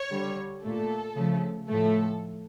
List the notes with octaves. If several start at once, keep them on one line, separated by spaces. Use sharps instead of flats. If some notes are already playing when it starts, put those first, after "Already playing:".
Already playing: C#5
D3 G3
A#2 A3 A4
C#3 F3 A3
A2 F3 A3 A4